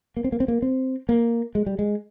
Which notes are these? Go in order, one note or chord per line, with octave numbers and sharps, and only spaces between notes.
A#3
C4
A#3
C4
A#3
C4
A#3
G#3
G3
G#3